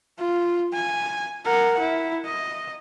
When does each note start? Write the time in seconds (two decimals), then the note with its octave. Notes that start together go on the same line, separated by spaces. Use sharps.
0.19 F4
0.73 G#5
1.45 A#4 F#5
1.79 E4
2.25 D#5